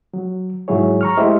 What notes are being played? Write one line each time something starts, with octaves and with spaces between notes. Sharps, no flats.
F#3
G#2 F#3 E4 G#4 C#5
A#5 C#6 F6
G#3 A3 E4 G4 C5 D#5